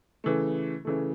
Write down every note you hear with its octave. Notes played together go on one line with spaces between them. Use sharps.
C#3 E3 A3
C#3 E3 A3